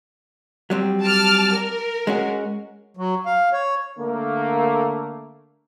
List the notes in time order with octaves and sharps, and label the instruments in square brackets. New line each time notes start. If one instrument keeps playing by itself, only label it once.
[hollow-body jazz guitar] F#3 G3 C4
[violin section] A5 D6 F6
A#4
[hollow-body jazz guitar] G#3 C#4 F#4
[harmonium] F#3
F5
C#5
[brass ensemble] D3 A3 A#3